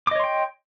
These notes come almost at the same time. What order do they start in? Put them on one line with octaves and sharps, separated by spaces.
D6 D#5 C#5 C6 G5